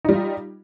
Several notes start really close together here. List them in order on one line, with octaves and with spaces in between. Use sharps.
D#4 G3 F4